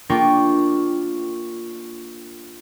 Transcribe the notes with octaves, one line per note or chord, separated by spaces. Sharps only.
A#3 D4 F4 G5 C#6